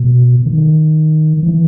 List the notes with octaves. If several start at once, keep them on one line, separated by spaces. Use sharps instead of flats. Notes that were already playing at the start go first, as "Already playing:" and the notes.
Already playing: B2
D#3
E3